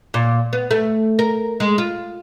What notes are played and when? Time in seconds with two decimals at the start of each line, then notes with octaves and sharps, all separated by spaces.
0.14 A#2
0.53 B3
0.71 A3
1.19 A#4
1.60 G#3
1.78 F4